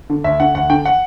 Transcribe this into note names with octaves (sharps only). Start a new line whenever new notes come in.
D3
D2 E5
D3 F#5
D2 F#5
D3 G5
F#5